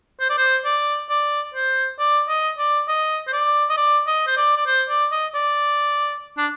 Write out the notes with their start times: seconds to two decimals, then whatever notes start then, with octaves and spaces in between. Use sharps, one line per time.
0.20 C5
0.29 D5
0.37 C5
0.65 D5
1.10 D5
1.54 C5
1.99 D5
2.28 D#5
2.58 D5
2.88 D#5
3.27 C5
3.32 D5
3.70 D#5
3.77 D5
4.07 D#5
4.27 C5
4.37 D5
4.57 D5
4.66 C5
4.89 D5
5.11 D#5
5.34 D5
6.37 D4